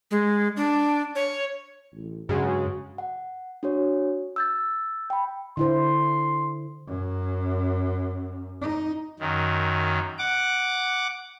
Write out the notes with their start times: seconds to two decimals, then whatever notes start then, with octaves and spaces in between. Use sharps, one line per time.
0.11 G#3
0.57 D4
1.16 C#5
1.92 A1
2.29 G2 C#3 F#3 G#3 F#4
2.98 F#5
3.63 D4 F#4 C#5
4.36 E6 G6 A6
5.10 G5 B5
5.57 D3 E4 C5 C6
6.87 F#2
8.61 D#4
9.19 F#2 D#3
10.18 F#5 D6